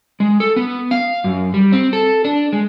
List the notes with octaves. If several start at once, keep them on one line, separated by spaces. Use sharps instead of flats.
G#3
A4
B3
F5
F#2
G3
C4
A4
D4
G#3